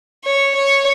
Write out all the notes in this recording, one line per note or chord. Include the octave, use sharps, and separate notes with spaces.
C#5
C#5